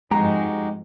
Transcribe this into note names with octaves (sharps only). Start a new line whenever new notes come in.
F2 G#2 G#3 D#4 F#4 G4 A#5